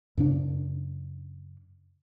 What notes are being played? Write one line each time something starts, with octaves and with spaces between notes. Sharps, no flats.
F#2 C#3 D4